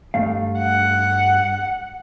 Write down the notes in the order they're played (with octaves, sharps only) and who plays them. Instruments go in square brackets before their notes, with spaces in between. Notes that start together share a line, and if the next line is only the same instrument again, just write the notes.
[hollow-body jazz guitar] G2 A3 F5
[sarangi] F#5